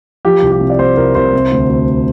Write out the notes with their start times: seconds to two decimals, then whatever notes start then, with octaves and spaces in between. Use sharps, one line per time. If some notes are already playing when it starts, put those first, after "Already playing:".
0.25 F3 G4
0.42 C2
0.52 G4
0.61 C3
0.70 D5
0.79 C3 C5
0.97 C2 A#4
1.15 C2 C5
1.33 C3
1.52 D2
1.69 D2